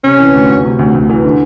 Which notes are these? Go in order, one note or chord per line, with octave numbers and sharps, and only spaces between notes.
C3 C#4
E3
D2
D2
C3
D2
D2
E3
D3